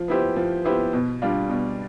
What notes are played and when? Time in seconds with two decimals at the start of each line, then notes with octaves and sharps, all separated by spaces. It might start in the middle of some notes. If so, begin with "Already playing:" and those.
Already playing: F3
0.08 B3 E4 G4 C5
0.36 F3
0.64 B3 E4 G4 C5
0.93 B2
1.22 G3 D4 F4
1.50 B2